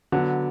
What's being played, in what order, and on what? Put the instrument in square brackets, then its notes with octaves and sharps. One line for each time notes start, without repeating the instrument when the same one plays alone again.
[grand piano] D3 F#3 B3